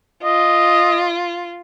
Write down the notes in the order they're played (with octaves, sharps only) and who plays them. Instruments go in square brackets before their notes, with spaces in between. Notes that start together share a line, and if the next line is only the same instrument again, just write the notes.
[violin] F4 [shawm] D#5